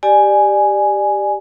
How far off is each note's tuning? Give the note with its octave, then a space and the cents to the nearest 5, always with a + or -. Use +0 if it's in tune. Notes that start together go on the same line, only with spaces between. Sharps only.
G4 +0 D5 +25 G#5 +0